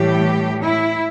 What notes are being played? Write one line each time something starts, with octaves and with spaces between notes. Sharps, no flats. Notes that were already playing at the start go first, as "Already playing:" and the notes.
Already playing: A2 E3 G3 G4
E4